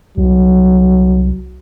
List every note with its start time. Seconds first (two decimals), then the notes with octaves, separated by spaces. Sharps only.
0.18 C2 F#3